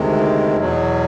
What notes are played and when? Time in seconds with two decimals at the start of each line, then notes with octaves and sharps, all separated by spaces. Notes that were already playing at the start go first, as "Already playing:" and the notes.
Already playing: D2 C3 D#3 G#3
0.57 E2 B2 F#3